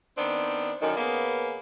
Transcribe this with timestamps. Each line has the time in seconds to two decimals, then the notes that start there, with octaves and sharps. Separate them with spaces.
0.18 D#3 B3 C4 D4
0.81 F#2 D3 D#3
0.97 C#3 A#3 B3